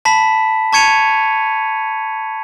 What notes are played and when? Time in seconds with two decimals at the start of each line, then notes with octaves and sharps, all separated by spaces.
0.05 A5 B5 B6
0.73 A5 C#6 G#6 C#7 D#7 F7